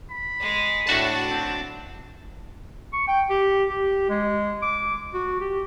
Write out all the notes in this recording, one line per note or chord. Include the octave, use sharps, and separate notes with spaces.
B5
G#3 G#4
A2 D4 F#4 A5
C4
C#6
G5
G4
G4
G#3
D6
F#4
G4